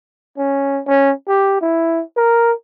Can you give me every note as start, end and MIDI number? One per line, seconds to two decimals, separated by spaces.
0.38 0.81 61
0.87 1.12 61
1.28 1.58 67
1.61 2.03 64
2.17 2.53 70